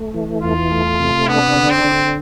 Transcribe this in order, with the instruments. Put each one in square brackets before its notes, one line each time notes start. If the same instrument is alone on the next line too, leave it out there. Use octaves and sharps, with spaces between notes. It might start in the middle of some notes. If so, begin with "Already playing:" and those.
Already playing: [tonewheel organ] A3
E3
[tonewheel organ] E2 [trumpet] F4
[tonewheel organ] A3
C3
[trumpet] B3 [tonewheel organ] D4
[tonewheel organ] D3
[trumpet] C4
[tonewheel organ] D3